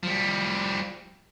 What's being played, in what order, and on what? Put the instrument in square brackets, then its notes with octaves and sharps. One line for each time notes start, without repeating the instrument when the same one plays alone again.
[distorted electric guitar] F3 G3